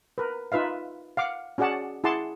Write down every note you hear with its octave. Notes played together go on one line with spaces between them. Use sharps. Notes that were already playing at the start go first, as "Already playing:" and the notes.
A#4 B4
D#4 F4 B4 E5 F5
F5 F#5 D6
C#4 F#4 G#4 D5 F#5 A5
E4 G#4 F#5 A5 C6 D6